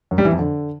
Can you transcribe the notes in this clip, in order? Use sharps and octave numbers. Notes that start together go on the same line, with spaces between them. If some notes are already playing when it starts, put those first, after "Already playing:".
F#2
G3
E3
F2
D3